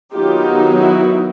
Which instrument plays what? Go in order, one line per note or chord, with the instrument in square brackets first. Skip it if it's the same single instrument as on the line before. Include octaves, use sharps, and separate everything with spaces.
[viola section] D#3 F#3 B3 D#4 F4 G4
E4 F#4